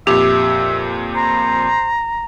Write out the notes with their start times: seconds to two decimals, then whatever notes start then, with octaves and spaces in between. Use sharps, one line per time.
0.07 F2 A#2 G4 E5
1.15 C5 A#5